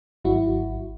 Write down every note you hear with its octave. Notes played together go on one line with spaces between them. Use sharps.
G#1 F#3 E4 F#4